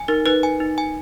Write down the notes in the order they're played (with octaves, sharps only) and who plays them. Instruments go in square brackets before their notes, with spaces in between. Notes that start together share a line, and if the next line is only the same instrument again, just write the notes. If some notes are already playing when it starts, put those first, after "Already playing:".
Already playing: [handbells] G#5
[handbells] D#4 [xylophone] A#4
[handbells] D#4 [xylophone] B4
[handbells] G#5
D#4
G#5